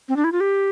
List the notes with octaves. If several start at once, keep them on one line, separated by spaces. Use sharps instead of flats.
C4
D4
E4
F4
G4